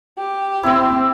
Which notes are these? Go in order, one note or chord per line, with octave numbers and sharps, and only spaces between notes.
G4
C4 E4 E6